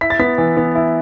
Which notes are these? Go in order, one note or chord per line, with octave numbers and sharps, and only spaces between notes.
E4 B6
A6
B3 B6
E3
B3
E4